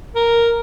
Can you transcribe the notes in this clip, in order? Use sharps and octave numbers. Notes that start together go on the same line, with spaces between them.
A#4